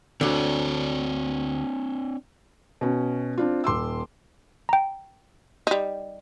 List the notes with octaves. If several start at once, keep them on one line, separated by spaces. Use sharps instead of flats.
D2 D3 C4 D4 C#5
B2 C#4
C4 D4 F4
D#1 C6 D6 E6
G5 A#5
G3 D#4